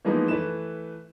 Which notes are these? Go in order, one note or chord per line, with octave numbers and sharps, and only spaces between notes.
E3 F3 G#3 A#3 B3 D#4
E3 A3 B4 E7